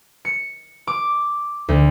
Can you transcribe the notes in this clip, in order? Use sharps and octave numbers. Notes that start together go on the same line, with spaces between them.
C#7
D6
D2